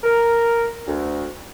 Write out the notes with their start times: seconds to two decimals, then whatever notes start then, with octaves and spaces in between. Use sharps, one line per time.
0.04 A#4
0.87 D2